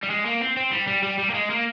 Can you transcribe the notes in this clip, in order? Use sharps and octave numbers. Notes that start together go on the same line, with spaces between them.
G3
G#3
A#3
C4
C4
G3
G3
G3
G3
A#3
G#3
A#3